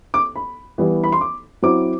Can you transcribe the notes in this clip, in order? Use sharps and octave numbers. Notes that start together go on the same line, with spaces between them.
D6
B5
E3 G3 B3 E4
B5
C6
D6
F#3 C4 E4 D6